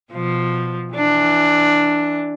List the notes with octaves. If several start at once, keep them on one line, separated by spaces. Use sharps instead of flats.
B2 F3
E3 D4